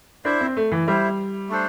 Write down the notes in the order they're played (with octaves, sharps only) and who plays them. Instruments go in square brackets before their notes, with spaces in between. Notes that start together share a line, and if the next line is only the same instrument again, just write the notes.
[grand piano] D4 [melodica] E4 C5 E5
[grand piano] C4
A3
E3
[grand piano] G3 [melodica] E4 C5 E5
[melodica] A3 D4 A4 C5